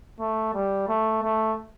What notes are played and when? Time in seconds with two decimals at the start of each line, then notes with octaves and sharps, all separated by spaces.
0.20 A3
0.54 G3
0.88 A3
1.23 A3